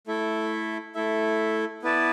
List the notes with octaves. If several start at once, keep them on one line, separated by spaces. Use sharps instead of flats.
A3 E4 A4 E5
A3 E4 A4 E5
B3 E4 B4 D5 A5